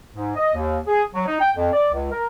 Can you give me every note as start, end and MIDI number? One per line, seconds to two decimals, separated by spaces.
0.13 0.33 44
0.36 0.53 75
0.54 0.78 39
0.87 1.03 68
1.14 1.23 54
1.26 1.38 63
1.41 1.50 79
1.55 1.71 41
1.73 1.89 74
1.92 2.10 37
2.11 2.25 70